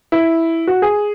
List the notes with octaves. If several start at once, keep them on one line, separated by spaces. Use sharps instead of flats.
E4
F#4
G#4